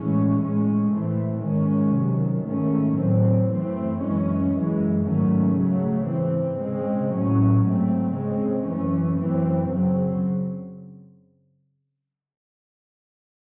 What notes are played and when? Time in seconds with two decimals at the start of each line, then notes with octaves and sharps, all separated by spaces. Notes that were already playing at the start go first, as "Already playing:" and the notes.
Already playing: A2 E3 G#3 C#4
0.39 A2 G#3 C#4
0.91 A2 E3 A3 C4
1.42 G#2 D#3 G#3 C#4
1.94 C3 D#3 F#3
2.45 G#2 D#3 A3 C#4
2.97 A2 F#3 C4
3.49 F#2 E3 A3 C4
4.01 F#2 E3 G#3 C#4
4.52 F#2 E3 G#3
5.04 G#2 D#3 F#3 A3 C#4
5.55 C#3 F#3 A3
6.07 G#2 E3 C4
6.58 C#3 G#3 C4
7.10 A2 F#3 C#4
7.62 G#2 F#3 A3 C4
8.13 C#3 G#3 C4
8.65 F#2 E3 A3 C#4
9.17 F#2 E3 C4
9.68 C#3 F#3 C4